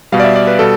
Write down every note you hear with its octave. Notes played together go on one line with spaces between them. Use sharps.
B2 G3 F5
D5
E5
D5
B4
B2 G3 A4